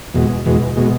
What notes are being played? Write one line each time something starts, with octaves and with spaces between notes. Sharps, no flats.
E2 B2 G#3
E2 B2 G#3
B2 G#3